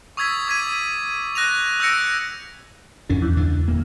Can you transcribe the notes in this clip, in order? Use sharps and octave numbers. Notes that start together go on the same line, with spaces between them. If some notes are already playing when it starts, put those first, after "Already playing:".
C#6 D#6 E6 G#6 A6 B6
D6 D#6 G#6 B6 D#7
F#6 A#6 D#7 F7
E6 G6 A#6 C#7 D7
F2 C#4 D4
E2
C#2 D4
D1 A#3